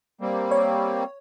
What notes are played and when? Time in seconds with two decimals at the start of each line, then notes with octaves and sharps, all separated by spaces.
0.21 G3 A#3 C4
0.51 C#5